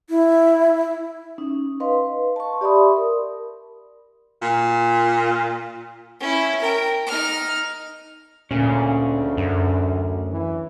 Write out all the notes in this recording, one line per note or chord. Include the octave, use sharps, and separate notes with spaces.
E4
C#4 D#4
B4 D#5 F5 C6
A5 C#6
G4 D5 E5 B5 C6 D#6
A#4
A#2
C#4 E4
A#4 G5
D#4 F6
D2 A#2 C#4 G#4
F#2
E3